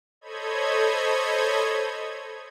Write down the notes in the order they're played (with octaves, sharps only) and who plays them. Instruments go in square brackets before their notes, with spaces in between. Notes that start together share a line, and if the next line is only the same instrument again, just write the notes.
[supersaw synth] A4 C5 C#5 D#5 B5 G#6